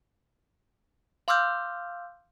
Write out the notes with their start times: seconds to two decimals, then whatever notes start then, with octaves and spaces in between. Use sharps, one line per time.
1.28 F5 C6 D6 E6 F6 G6